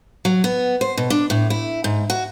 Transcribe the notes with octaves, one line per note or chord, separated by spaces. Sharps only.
F#3
B3
C5
B2
D4
A2
E4
G#2
F#4